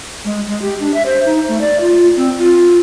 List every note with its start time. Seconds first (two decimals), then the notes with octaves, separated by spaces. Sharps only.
0.25 G#3
0.48 G#3
0.62 G4
0.80 D4
0.94 E5
1.06 C5
1.25 D#4
1.48 A3
1.61 D5
1.81 F4
2.17 C4
2.39 F4